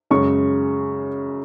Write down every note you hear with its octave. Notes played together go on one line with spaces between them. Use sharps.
F#2 C#3 G#3 C#6